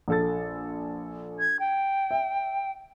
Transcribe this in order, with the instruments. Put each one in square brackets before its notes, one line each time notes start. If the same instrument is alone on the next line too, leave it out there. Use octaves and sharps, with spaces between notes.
[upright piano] A#1 A4 A6
[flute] G#6
G5
[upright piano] E5